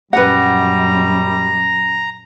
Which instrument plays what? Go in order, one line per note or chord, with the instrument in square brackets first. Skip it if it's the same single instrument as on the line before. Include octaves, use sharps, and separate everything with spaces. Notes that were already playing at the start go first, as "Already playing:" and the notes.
[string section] A#1 F#2 [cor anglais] G3 [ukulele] B4 F#5 [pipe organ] A#5